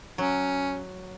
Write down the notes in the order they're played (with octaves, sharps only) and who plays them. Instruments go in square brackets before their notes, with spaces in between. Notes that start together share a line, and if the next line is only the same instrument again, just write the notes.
[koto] F#3 [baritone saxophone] C#4